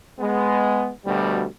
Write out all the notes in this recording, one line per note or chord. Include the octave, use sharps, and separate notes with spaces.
G#3 B3
D2 B2 G3